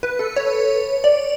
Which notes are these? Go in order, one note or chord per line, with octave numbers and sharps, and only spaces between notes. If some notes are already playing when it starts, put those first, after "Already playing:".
B4
A4
C#5
D5